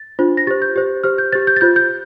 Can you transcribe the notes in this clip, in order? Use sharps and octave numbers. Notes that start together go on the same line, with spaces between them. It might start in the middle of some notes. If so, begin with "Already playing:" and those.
Already playing: A6
D4 F4 C5
A#6
G4 C5 A6
G6
G4 C5
G4 C5 F6
G6
G4 C5 A6
G6
A6
F4 C5 G6
G6